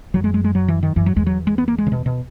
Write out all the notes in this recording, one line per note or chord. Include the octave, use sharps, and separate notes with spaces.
F#2 F#3
G#3
G#3
G#3
F#3
E3
D#3
F#2 E3
F#3
E2 G#3
F#3
G#3
B3
A#3
G#3
C#3
B2
B2